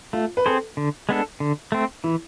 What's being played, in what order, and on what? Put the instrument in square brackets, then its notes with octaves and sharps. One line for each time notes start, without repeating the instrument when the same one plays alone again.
[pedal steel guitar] A3 [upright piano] F4
[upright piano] B4
[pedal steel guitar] C4 G#4 C5 [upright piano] A4
[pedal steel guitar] D3
G#3 B3 D4 A4
D3
A3 C4
[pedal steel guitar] E3 [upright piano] E4